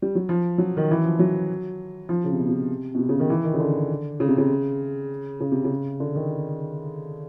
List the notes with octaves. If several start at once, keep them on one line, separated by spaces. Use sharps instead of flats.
G3
F#3
F3
F#3
D#3
E3
F3
F#3
F3
C#3
C3
B2
C3
B2
C3
C#3
D#3
E3
D#3
C#3
D3
C#3
C3
C#3
C#3
C3
C#3
D3
D#3